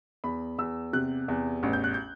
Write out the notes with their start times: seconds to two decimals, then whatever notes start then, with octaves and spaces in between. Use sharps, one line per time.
0.24 E2 B5
0.58 E2 E6
0.93 C3 F#6
1.28 E2
1.63 A1
1.73 G6
1.84 F#6
1.94 G6